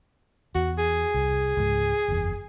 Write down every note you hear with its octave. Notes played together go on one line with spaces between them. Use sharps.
E2 F#4
G#4
C2
C#2 G#2
F#1 E2